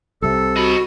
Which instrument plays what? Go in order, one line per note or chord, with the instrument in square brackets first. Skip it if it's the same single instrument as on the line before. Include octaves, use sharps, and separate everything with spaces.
[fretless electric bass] C2 C3 [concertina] A4
[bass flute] F#4 [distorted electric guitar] D#5 B5